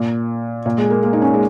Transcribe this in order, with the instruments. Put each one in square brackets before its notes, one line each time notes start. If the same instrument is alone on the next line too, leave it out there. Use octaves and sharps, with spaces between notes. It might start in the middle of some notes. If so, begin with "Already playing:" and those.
Already playing: [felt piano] A#2
A#2
G#3
A#3
A#3
D#4
C#4
G#3